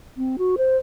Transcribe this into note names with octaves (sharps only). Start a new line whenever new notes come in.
C4
F#4
C5